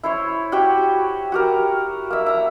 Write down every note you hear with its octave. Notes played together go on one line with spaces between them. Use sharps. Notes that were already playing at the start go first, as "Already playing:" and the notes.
E4 C5 C#5
F#4 G4 G5
F#4 G4 A#4
A#3 E5
E5 A#5